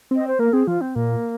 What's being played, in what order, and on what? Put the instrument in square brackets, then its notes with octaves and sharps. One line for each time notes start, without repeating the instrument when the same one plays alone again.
[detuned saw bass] C4 [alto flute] D#5
[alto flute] C5
[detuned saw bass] A#3 [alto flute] A#4
[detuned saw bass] C4 [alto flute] G#4
[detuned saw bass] F3 [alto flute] F4
[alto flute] C4
[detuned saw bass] A#2 [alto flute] A#3